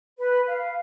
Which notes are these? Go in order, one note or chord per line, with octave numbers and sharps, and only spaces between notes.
B4
F5